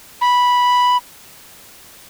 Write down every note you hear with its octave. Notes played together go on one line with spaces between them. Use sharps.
B5